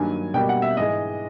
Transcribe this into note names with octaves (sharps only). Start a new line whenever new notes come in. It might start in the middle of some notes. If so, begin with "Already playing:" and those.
Already playing: G2 D#3 F#3 A#3 G#5
B2 G3 A#3 G5
F#5
E5
G#2 E3 G#3 D#5